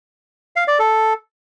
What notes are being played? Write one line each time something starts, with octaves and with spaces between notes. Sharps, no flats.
F5
D5
A4